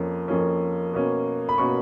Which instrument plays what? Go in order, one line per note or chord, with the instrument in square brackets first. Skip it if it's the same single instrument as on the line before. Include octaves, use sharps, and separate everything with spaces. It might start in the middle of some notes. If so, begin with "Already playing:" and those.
Already playing: [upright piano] F2 F3 A#3 C#4
F2 F3 A#3 C#4
B2 A#3 C#4
B5
B2 A#3 C#4 C#6